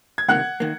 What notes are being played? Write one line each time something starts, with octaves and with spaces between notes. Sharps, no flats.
G#6
C#2 C3 D#3 A#3 F#5 F#6
D#3 A#3